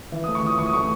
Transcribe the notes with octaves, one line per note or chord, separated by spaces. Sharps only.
E3
D#6
A3
C#6
E3 D#6
E3 C#6
D#6
A3 C#6